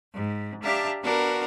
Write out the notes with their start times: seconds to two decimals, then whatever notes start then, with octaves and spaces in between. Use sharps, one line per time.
0.13 G#2
0.63 D4 G4 E5 F5 A5 A#5
1.01 B3 D4 F#4 A#4 F5